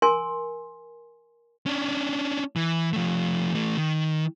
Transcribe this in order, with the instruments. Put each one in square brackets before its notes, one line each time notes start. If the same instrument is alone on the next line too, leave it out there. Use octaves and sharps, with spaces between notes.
[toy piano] A#4 G#5 C6
[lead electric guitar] C#4 D4
E3
F3 A3
E3 A3
D#3